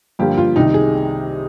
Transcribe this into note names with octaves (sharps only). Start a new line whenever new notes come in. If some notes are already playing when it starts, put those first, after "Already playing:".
G2 D3 F3 A#3 G4
F4
C2 C3 D#3 D#4
G#4